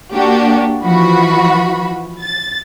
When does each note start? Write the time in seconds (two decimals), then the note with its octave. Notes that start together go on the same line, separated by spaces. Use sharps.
0.13 A#3 D4 F#4 G4
0.83 E3 F3 F#4 B5
2.22 A6